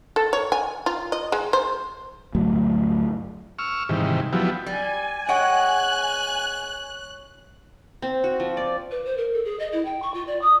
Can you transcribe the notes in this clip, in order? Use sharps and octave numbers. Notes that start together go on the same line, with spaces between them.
A4
C#5
G#5
F4
D#5
G#3
C5
D2 G2 F#3 A3
C#6 E6 F6
G#2 C3 D#3 E3 G3
F3 F#3 B3 E4 G4
G3 G#5
G#3 C#5 F#5 G5 C#6 F#6
C4
F#4
F3
D5
B4
C5
A#4
A4
G#4
D#5
E4
G5
C#6
F4
D5
D#6